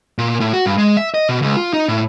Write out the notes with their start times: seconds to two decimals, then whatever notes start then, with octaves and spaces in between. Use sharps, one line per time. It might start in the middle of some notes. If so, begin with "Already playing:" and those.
0.18 A#2
0.40 A2
0.53 F#4
0.66 G2
0.78 G#3
0.97 E5
1.14 D#5
1.29 B2
1.42 C#2
1.57 F4
1.73 D#4
1.88 A2